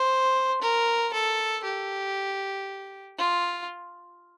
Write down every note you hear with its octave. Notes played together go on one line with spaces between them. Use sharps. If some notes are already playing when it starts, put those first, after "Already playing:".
Already playing: C5
A#4
A4
G4
F4